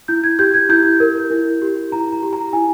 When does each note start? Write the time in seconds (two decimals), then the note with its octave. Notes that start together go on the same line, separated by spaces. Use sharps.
0.08 E4 G6
0.24 G#6
0.39 G4 G6
0.54 G#6
0.69 E4 G6
1.00 A#4
1.31 E4
1.62 G4
1.92 E4 A#5
2.12 A#5
2.22 G4
2.33 A#5
2.53 E4 G#5